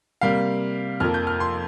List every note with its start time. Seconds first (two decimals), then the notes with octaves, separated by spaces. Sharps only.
0.21 C3 G3 A#3 F5
1.00 F2 F3 A#3 F6
1.14 G6
1.27 F6
1.40 C6